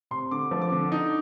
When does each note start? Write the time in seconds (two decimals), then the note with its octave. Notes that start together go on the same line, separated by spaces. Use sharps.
0.11 C3 C6
0.31 D3 D6
0.51 F3
0.62 D6
0.72 D3
0.92 D#4